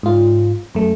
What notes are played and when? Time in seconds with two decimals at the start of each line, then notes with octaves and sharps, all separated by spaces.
0.03 G#2 F4
0.75 F#2 A3